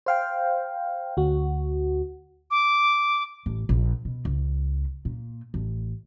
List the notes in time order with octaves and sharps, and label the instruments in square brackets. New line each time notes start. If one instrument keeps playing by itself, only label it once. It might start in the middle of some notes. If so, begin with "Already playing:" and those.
[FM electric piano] C5 F5 G5
D2 F#4
[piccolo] D6
[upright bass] A1
A#1
B2
C#2
A#2
A1